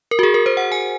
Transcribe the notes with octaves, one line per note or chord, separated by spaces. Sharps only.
A#4
F#4
G#4
A#4
C5
F#5
G#5